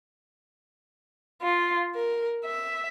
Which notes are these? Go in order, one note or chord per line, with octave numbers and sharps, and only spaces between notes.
F4
A#4
E5